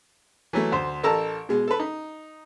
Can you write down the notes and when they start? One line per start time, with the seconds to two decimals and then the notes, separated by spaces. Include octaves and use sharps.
0.53 E3 F#3 A3
0.72 D2 C5
1.03 A1 A4 A#4 A5 A#5 E6
1.49 B2 G#3
1.68 A4 B4
1.80 D#4